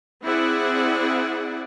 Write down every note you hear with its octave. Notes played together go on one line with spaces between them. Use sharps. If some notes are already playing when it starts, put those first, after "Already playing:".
C4 E4 G#4 D5 F#5